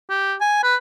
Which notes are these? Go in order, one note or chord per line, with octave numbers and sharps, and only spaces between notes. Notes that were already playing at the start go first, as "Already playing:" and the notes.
G4
G#5
B4